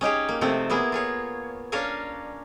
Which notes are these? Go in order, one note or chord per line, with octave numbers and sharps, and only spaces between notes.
C#4 D#4 G4 G#4
A#3
C3 F3 A3 C4 C5
A#3 B3 E4 G#4 A#4
F4 G#4 C#5
C#4 D4 A#4 C#5 F5 G#5